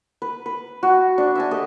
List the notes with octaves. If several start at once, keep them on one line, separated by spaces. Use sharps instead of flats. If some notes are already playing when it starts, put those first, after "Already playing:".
B4
B4
F#4
D4
E5 G#5 A5
G4 A4 D#5